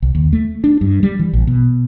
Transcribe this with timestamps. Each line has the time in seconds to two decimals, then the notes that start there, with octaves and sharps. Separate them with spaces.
0.02 C2
0.15 D#2
0.33 A3
0.64 D4
0.81 G2
1.03 G3
1.19 E3
1.33 A#1
1.47 B2